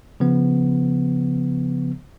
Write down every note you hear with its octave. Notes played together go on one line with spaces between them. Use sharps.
C#3 F3 B3